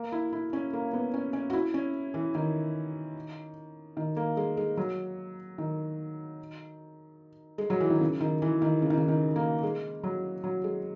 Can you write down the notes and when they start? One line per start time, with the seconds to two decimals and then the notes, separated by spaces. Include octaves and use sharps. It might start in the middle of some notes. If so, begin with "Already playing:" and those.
Already playing: A#3
0.12 E4
0.33 E4
0.53 C#4
0.73 A#3
0.93 B3
1.14 C#4
1.33 C#4
1.50 F#4
1.53 E4
1.74 C#4
2.14 E3
2.35 D#3
3.97 D#3
4.16 A#3
4.37 G#3
4.57 G#3
4.77 F#3
5.58 D#3
7.58 G#3
7.70 F#3
7.80 E3
7.90 D#3
8.01 C#3
8.21 D#3
8.42 E3
8.62 D#3
8.82 C#3
8.90 D#3
8.97 C#3
9.08 D#3
9.36 A#3
9.63 G#3
10.03 F#3
10.44 F#3
10.64 G#3